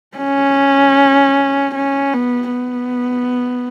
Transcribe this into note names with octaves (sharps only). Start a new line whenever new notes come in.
C#4
C#4
B3
B3